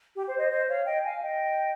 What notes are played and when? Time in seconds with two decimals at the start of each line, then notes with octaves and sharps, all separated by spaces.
0.14 G4
0.27 C5
0.38 C5 D#5
0.50 C5 D#5
0.68 C#5 F5
0.86 D#5 G5
1.04 F5 G#5
1.21 D#5 G5